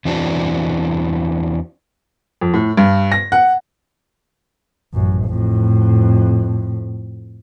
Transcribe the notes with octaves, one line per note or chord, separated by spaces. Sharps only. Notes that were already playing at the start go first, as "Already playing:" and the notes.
E2 E3 C4 D4 F#4
F2
A2
G2
A#6
F#5
A1 F#2
F2 A2